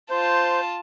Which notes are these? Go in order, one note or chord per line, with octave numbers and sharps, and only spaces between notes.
F4 C5 A5 G6